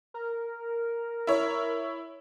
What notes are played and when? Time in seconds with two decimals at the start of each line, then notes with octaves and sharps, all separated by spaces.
0.14 A#4
1.27 E4 C#5